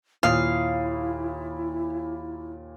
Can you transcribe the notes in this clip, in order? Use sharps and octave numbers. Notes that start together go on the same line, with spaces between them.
D#2 A#2 E4 F5 D#6